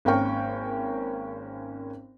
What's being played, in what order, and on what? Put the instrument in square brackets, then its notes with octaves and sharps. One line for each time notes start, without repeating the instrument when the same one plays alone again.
[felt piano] G#1 A#3 C#4 A#4 G5 C#6